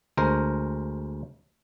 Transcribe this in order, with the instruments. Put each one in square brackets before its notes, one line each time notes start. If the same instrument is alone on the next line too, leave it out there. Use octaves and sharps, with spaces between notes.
[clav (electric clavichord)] D2 G#3 A#4 C5